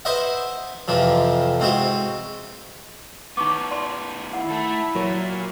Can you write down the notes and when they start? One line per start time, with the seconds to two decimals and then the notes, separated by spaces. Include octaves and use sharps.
0.05 B4 C5 D#5 E5 F#5
0.88 F2 C3 E3 F3
1.60 G#2 C4 E4 F#4
3.37 D#3 B3 D#4 C#6 D6
3.71 D5 A5 C6
4.33 E4 F#5
4.50 A3 A4
4.95 A#2 F#3 A#4 C#5